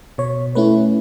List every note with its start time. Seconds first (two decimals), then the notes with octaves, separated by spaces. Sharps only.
0.18 B2 C#5
0.55 A3 C#4 E4 B4